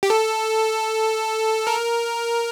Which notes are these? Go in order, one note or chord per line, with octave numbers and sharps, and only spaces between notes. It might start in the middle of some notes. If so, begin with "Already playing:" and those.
G4
A4
A#4